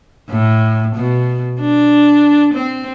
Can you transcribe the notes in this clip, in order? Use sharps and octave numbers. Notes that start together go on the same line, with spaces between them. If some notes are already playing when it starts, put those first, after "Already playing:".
A2
B2
D4
C4